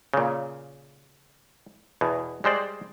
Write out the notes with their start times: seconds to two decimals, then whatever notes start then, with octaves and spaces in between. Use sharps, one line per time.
0.14 A#2 C#3
2.01 E2 B2
2.44 G3 G#3 C5 D5